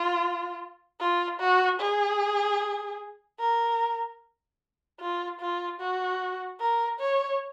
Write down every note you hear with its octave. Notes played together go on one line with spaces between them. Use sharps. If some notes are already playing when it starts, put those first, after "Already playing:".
Already playing: F4
F4
F#4
G#4
A#4
F4
F4
F#4
A#4
C#5